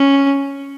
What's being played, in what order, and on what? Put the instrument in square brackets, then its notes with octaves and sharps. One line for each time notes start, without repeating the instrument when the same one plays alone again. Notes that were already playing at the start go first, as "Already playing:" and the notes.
Already playing: [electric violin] C#4